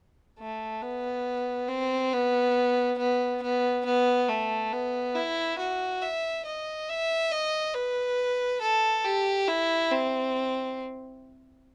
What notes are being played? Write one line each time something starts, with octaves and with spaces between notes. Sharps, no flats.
A3
B3
C4
B3
B3
B3
B3
A3
B3
E4
F#4
E5
D#5
E5
D#5
B4
A4
G4
E4
C4